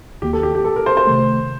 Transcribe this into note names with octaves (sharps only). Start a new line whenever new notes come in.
D#2 D#3 A#3 G4
A4
G4
G4
A4
A#4
C5
C5
C3 D#3 A3